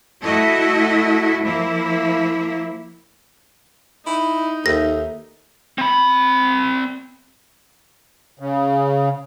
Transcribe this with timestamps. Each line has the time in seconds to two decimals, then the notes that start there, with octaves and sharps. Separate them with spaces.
0.22 A3 E4 F#4 A4 D#5
1.43 F3 A#3 E4
4.07 D#4 E4
4.66 D#2 A4 A#4 E5 A#6
5.78 C4 B5
8.40 C#3